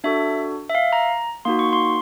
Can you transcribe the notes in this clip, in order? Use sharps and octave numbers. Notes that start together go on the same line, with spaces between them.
D4 F#4 A4 E5
E5
F5
A#5
A#3 D#4 F#4 C6
C#6
C6